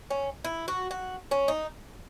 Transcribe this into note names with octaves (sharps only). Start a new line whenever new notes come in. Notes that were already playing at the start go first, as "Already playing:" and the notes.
C#4
E4
F#4
F#4
C#4
D#4